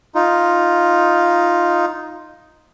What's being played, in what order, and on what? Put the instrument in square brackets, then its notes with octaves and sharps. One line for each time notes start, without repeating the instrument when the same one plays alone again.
[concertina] D#4 F4